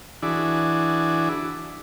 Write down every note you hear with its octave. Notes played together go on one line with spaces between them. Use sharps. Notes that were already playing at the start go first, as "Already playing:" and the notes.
E3 D4 E4 F#4 G#4 D5